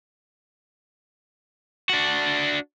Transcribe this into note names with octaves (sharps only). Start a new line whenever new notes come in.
D4 F#4